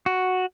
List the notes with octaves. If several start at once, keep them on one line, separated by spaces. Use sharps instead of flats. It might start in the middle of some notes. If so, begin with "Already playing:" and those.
F#4